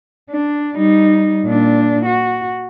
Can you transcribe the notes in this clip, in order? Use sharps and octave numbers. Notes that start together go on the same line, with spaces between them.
D4
G3 D#4
A#2 D4
F#4